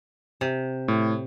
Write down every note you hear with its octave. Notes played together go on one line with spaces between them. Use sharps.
C3
A2